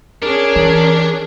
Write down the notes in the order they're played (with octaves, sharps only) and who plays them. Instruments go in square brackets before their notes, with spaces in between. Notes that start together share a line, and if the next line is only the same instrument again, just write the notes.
[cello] C#4 G#4 [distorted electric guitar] D4 [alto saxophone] A#4
[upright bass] E3